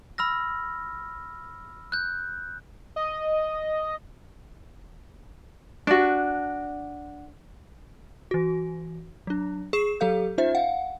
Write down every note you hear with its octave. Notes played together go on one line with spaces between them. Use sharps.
B5 E6 F6 A#6
F#6 G6
D#5
D4 F#4
E3 F#4
F#3 D4
G#4 C#6 C7 E7
F#3 G4 A4 F5 G6
C#4 D#4 F4 C5 E5
F5 F#5